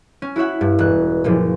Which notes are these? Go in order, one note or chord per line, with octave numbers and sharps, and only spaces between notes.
C#4
E4 F#4 C#5 E5 F#5
G2
E1 F#6
F#1 A#2 F3